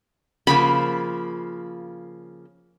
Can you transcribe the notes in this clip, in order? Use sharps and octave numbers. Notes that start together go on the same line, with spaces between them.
C#3 F3 A#3 B5